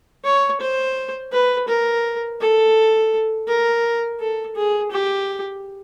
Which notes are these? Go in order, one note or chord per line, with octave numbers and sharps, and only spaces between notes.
C#5
C5
B4
A#4
A4
A#4
A4
G#4
G4